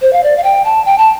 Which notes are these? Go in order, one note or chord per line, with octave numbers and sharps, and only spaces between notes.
C5
F5
D5
F5
G5
A5
G5
A5